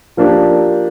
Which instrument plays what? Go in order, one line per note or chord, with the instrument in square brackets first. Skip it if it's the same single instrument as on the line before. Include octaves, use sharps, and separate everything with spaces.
[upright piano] F3 A#3 D4 G4